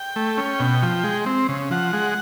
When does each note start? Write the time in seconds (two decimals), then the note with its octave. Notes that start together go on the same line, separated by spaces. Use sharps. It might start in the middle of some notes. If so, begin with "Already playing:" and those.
Already playing: G5
0.16 A3
0.37 C#4
0.60 B2
0.83 F3
1.04 G#3
1.26 C4
1.49 C#3
1.71 F3 F#5
1.93 G#3